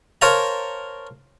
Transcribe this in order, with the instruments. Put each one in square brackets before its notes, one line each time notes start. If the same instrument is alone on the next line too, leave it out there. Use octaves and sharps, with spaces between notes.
[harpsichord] A#4 C5 C#5 F5 A5 A#5